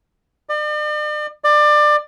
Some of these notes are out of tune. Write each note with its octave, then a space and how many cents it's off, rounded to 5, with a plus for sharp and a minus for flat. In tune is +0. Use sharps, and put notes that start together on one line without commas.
D5 +40
D5 +25